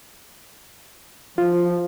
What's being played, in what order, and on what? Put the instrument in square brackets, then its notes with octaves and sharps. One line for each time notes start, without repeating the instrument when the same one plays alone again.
[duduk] F3 [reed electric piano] F4